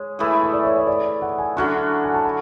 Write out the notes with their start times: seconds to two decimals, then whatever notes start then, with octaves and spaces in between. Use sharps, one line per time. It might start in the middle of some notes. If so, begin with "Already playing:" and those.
Already playing: G#3 C#5
0.19 E3 A3 E4 G#4
0.43 E5
0.53 D5
0.65 C#5
0.77 D5
0.87 D5
1.22 F#5
1.38 G#5
1.57 D3 F#3 C#4 F#4 C#6
2.04 G#5
2.14 A5
2.25 B5